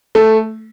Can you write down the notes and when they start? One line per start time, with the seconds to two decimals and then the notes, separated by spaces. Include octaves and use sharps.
0.15 A3